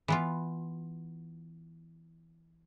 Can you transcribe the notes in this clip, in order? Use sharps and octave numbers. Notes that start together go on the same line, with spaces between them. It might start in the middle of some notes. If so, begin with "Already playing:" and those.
E3 B3 F4